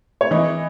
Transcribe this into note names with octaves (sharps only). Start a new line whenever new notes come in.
C#5
E3 D#5